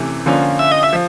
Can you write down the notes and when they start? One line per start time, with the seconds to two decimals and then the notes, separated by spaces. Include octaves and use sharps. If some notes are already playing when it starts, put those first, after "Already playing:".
Already playing: C3 E3 A3 C#4
0.26 D3 F3 A#3 C#4 F4
0.59 E5
0.72 D#5
0.83 E5
0.93 F3